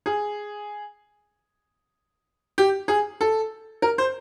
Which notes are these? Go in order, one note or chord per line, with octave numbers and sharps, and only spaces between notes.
G#4
G4
G#4
A4
A#4
C5